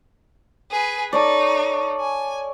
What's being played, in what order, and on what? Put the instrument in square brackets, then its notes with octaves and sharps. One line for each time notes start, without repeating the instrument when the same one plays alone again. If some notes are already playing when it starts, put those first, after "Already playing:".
[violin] G#4 B4
[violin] D#4 [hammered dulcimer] A4 C#5 D5
[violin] G#5